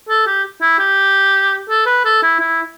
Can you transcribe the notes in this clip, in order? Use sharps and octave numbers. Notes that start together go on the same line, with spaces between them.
A4
G4
E4
G4
A4
B4
A4
E4
E4